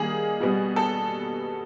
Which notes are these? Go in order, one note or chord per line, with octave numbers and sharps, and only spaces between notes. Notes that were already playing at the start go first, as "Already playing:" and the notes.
Already playing: D#3 G3 A#3 G#4
B2 G3 B3
A4